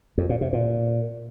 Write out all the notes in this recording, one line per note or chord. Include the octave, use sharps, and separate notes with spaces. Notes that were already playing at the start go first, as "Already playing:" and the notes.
F2
A#2
C3
A#2